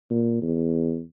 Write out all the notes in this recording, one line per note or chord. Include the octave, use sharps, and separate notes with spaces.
A#2
E2